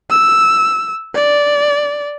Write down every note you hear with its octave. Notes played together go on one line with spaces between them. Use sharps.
E6
D5